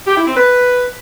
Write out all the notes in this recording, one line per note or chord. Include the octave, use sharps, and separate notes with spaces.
G4
E4
C4
B4